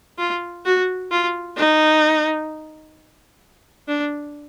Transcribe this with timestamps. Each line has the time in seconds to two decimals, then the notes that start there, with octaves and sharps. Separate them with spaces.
0.18 F4
0.65 F#4
1.11 F4
1.57 D#4
3.88 D4